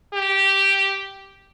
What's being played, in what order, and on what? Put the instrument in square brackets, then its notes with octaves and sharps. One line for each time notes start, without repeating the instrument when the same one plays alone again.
[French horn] G4